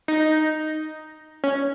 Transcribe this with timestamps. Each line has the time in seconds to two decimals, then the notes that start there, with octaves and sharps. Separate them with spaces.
0.08 D#4
1.44 C#4